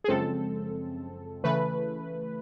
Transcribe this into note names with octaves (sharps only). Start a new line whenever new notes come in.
G#4
F#2 C#3 F3 G#3 C4 A4
C#3 E3 A3 B4